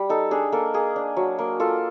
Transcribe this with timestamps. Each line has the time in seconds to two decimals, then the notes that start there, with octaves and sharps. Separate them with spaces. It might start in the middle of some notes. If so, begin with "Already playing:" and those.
Already playing: G3
0.09 D#4 A4
0.31 D4 G#4
0.52 A#3 A4
0.74 A#3 G#4
0.96 D4
1.16 F#3
1.39 A#3
1.60 F4 A4